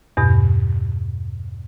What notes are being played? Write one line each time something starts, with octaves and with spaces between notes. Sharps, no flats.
E2 G2 B2